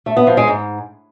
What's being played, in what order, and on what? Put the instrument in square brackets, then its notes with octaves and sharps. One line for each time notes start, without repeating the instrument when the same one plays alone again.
[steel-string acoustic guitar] A3
B3
F3
G#3
G#2